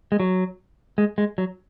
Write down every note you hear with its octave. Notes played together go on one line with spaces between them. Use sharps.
G#3
F#3
G#3
G#3
F#3